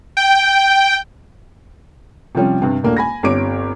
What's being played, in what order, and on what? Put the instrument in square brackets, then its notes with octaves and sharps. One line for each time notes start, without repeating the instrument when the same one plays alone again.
[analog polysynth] G5
[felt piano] C3 F3 G3 C#4
G2 C3
D#1 A2 A#3 D4
G#5 B5 A#6
G1 C4 G4 C#5 D6 D7